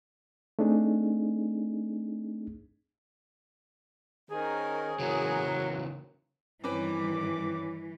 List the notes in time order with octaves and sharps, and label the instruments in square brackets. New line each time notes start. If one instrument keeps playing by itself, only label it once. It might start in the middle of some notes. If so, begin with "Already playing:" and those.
[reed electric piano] A3 C4 D4 D#4 G#4
[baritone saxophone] D#3 [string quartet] C#4 A#4 C5 [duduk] G#4
[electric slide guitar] C#3 E3 A#3 [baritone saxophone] F#3 [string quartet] A#4
[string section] G2 D#3 [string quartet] E3 [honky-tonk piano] C4 C#4 B4 [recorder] D6